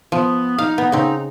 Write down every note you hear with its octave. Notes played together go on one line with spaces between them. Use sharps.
F3 B3
D#4 F5
B3
C#3 C4 D#4